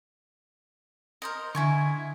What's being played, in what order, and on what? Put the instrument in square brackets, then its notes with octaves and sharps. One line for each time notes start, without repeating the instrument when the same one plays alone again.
[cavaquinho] A#4 C5 D#5
[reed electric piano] D3 [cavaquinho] E4 G#5 C#6